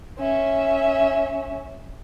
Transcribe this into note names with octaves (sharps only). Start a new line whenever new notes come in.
C#4 E5